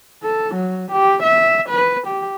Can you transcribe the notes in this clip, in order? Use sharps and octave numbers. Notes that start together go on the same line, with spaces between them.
A4
F#3
G4
E5
B4
G4